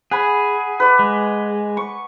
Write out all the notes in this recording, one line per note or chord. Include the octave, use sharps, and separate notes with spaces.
G#4 F#5 G#5 B5
B4 D5
G#3
C#6